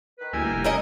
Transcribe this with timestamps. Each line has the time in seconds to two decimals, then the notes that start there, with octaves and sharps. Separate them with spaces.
0.18 D#3 B4
0.33 D2 G3 A#3 E4 G#5
0.50 F1
0.64 C3 C#4 A#4 D#5